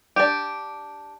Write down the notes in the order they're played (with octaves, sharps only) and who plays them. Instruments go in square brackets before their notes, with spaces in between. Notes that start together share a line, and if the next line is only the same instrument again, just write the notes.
[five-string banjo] D4 G4